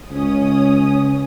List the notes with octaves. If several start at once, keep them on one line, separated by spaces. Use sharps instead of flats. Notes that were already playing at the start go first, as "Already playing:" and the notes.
C#2 C#4 D#6